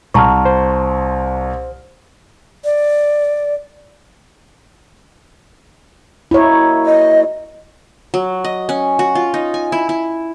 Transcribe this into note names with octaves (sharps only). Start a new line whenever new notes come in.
C2 A5 A#5 C#6 F6
C5
D5
F#3 A#3 D#4 E4 C#5
D#5
F#3
D#5
C#4
F#4
F4
D#4
G#5
E4
E4